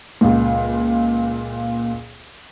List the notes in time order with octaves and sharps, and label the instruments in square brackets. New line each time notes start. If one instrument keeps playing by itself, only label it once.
[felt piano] C#2 A#2